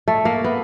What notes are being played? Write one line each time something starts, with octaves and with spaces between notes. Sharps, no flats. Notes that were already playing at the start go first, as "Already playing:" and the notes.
A3
A#3
B3